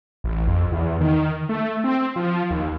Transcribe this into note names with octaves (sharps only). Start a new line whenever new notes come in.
A1
F2
E2
D#3
A3
C4
F3
D#2